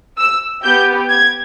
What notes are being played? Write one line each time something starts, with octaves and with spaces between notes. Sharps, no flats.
E6
B3 G4 G6
G#6